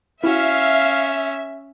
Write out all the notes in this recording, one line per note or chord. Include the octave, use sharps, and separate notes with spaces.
C#4 E4 F#4 E5 F5